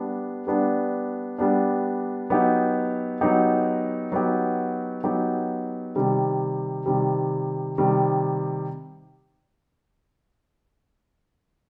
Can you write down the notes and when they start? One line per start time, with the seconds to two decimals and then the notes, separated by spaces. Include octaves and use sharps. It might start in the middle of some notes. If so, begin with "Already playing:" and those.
Already playing: G3 B3 D4
0.47 G3 B3 D4
1.38 G3 B3 D4
2.30 F#3 B3 D#4 G4
3.21 F#3 B3 D#4 G4
4.12 F#3 B3 D#4 G4
5.04 F#3 B3 D#4 G4
5.96 C3 D#3 G3
6.86 C3 D#3 G3
7.78 C3 D#3 G3